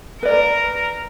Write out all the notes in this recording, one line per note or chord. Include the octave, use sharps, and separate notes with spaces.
A#4 B4 D5